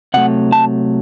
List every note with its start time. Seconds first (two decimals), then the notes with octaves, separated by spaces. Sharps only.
0.14 C3 F#3 A3 F#5
0.52 A5